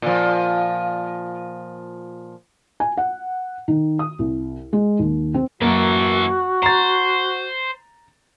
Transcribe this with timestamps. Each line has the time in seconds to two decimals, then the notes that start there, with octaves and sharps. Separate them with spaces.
0.02 A#2 F3
2.80 G#5
2.97 F#5
3.68 D#3
3.99 D#6
4.19 C2
4.73 G#3
4.99 D#2
5.34 C4
5.62 F#2 E3 A#3 F#4 A4
6.63 C5 A#5 A6